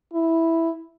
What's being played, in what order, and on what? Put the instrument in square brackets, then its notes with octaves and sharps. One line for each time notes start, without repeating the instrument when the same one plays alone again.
[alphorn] E4